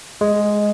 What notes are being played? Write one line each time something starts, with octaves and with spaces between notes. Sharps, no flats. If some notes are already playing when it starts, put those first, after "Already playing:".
G#3